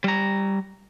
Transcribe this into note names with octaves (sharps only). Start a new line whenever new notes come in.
G3 A#5